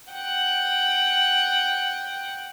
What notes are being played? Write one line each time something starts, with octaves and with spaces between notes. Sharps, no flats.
F#5 G5